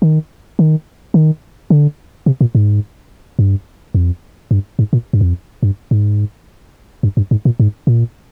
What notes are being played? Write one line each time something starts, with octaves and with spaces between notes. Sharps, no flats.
D#3
D#3
D#3
D3
C3
A#2
G#2
G2
F2
G2
G#2
A#2
G2
F2
G2
G#2
G2
G2
G#2
A#2
G#2
A#2